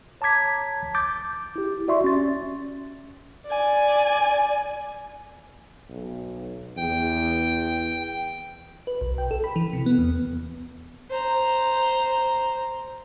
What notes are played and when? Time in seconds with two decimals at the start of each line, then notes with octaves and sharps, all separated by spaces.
0.21 C#5 A5 A#5 D6 G#6 B6
0.95 D6 G6 A6
1.56 E4 G4
1.88 F#4 D5 E5 C6 C#6
2.04 C#4 A6
3.47 D5 G#5
5.90 B1
6.77 E2 G5
8.87 B4
9.01 B1
9.18 G5
9.31 A4
9.44 B5
9.56 E3
9.73 C3
9.86 B3
9.98 E2
11.11 C5 A#5